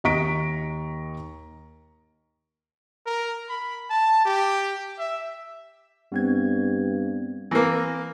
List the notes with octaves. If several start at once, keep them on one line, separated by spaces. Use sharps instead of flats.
D#2 D#5 A#5 C#6 B6 D7
A#4
B5
A5
G4
E5
G2 B3 C4 G#6
E3 A#3 C4 A#6